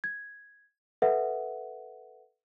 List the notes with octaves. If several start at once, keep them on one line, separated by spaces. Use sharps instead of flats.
G#6
A4 B4 E5 F#5